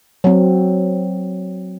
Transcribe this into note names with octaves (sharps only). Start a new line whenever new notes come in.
F#3 C4